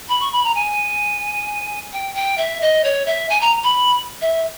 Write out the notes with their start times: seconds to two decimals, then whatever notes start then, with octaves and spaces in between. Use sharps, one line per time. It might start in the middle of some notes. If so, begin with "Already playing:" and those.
0.08 B5
0.20 C#6
0.32 B5
0.44 A#5
0.54 G#5
1.92 G5
2.15 G5
2.37 E5
2.61 D#5
2.84 C#5
3.06 E5
3.29 G#5
3.41 A#5
3.64 B5
4.21 E5